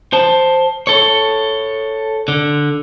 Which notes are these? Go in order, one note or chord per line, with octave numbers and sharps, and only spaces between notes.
C5 A5
A4 C#5
D3